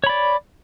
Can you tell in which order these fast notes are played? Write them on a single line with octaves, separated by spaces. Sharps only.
C#5 B5 D5